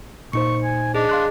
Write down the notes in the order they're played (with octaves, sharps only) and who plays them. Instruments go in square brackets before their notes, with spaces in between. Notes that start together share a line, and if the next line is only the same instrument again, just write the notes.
[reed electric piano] A#2 D#4 C5 [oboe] C#6 [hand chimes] C#7
[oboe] G#5
[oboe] D4 [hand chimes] G#4 D#5
[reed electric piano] F5 C6 F#6